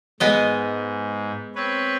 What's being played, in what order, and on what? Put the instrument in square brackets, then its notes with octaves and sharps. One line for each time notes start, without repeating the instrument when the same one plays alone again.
[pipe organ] G#2 [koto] G#3 B3 D#5
[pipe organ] C4 B4 C#5